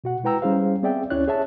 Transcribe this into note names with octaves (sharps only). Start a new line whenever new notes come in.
B2 F#4 F#5
G#3 E4 B4 G5 A#5 E6
G3 C#4 E4 G#4 C5 F5
B3 C4 G#4 D5 E5 G5
D2 C#4 E4 C#5 D5 F#6
G#4 C#5 E5 A5